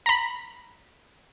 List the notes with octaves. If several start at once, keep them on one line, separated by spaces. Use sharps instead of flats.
A#5 B5